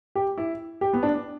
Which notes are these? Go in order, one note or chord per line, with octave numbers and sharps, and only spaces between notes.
G4
E4
G4
B3
D4